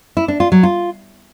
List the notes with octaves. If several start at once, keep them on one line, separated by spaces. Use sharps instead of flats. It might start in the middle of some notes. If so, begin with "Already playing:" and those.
E4
D4
F4
F#3
F4